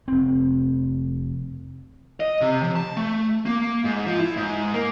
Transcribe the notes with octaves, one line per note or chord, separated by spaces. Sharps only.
F1 C4
D#5
C3
F3
A5
A3
A#3
G#2
F3
E4
G#2
A#3